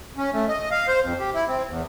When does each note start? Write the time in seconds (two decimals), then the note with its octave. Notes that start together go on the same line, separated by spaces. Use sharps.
0.17 C#4
0.34 A3
0.48 D#5
0.71 F5
0.88 C5
1.03 F2
1.19 G4
1.34 E4
1.48 C4
1.68 E2